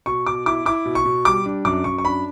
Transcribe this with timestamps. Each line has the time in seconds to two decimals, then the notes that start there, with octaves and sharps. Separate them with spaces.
0.06 B2 C#6
0.27 B2 D6
0.46 E4 D6
0.65 E4 D6
0.85 B2
0.95 C#6
1.06 B2
1.25 G3 D6
1.46 D4
1.65 F#2 D6
1.84 F#2 C#6
1.98 C#6
2.05 D4 B5